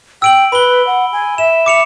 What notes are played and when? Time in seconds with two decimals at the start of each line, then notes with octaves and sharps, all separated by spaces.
0.22 G5 E6 D7 F#7
0.52 B4 B5 G7
0.87 F#5
1.13 G#5
1.38 E5 E7
1.66 D6 C#7 F7